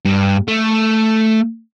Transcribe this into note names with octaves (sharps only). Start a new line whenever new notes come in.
G2
A3